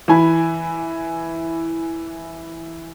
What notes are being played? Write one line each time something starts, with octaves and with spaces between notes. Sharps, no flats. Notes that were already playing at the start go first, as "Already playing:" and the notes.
E3 G#5 B5